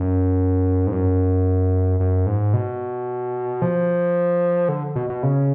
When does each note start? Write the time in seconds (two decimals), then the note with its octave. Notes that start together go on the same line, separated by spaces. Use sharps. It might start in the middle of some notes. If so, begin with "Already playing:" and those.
Already playing: F#2
0.87 G#2
0.92 F#2
2.00 F#2
2.26 G#2
2.54 B2
3.62 F3
4.69 D3
4.96 B2
5.10 B2
5.23 C#3